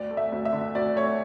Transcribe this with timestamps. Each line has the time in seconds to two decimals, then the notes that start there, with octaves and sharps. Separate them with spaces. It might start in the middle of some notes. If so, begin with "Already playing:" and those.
Already playing: D2 D5
0.11 A3
0.17 E5
0.32 D2
0.45 E5
0.53 D3
0.75 D2 D5
0.96 A3 C#5